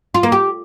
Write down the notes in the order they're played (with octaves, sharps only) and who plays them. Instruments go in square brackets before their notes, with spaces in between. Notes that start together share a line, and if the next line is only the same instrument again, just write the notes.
[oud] F4
A#3
G4